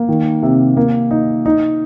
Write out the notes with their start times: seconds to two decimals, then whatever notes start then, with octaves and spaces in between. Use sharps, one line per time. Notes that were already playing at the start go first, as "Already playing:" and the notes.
Already playing: A#3
0.09 D#3
0.43 C3
0.77 A#3
1.11 D#4
1.46 D#4